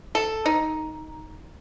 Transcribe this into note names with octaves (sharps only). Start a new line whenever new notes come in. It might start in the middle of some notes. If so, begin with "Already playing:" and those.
A4
D#4